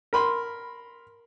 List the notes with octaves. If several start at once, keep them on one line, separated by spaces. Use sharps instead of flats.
A#4 B5 C6